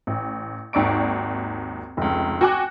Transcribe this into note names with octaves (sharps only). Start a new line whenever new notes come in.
A1
G#1 D#2 D5 C#6 D7
F1 C#2
F#4 G5 G#5 D6 F#6